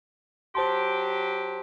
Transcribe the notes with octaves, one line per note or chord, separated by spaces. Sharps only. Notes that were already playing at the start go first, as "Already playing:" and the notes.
F#3 G4 C5 A5 C6